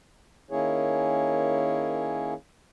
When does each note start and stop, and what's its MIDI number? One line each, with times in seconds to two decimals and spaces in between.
0.51 2.34 51
0.51 2.34 58
0.51 2.34 61
0.51 2.34 64
0.51 2.34 68
0.51 2.34 73